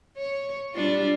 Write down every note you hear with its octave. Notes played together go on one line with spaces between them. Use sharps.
C#5
G3 D4 F4